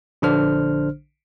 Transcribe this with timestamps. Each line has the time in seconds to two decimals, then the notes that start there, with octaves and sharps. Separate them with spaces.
0.22 A#1 D3 D4 C5 F6